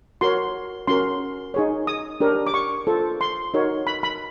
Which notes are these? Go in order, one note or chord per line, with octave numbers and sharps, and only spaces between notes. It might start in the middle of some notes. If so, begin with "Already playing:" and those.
F#4 A#4 C#5 C6
C#4 F#4 A#4 C6
D#4 G#4 C#5
D#6
D4 G4 A#4 C#5
D6
C#6
F4 A4 C5
C6
D#4 F#4 A#4 C#5
B5
B5